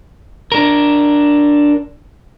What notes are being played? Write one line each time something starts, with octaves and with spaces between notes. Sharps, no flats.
D4 A#4